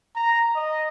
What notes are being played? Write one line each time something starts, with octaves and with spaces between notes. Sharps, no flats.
A#5
D#5